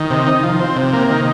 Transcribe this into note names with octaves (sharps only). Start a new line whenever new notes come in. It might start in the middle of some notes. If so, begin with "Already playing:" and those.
Already playing: D#3
C3
D#4
F3
C4
C3
A#3
D#3